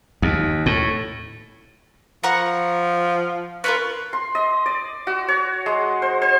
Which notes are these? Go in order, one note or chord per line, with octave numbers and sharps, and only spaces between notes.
D#2
A2
F3 F#5 A#5 C#6
C#4 F4 A#4 B4
C6
D#5
D5
F#4
C#5
G#3
C5
C5